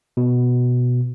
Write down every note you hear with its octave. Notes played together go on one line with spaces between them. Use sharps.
B2